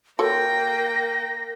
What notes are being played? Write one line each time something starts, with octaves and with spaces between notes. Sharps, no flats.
A#3 F#4 A4 A#4 C#5 G5 A#6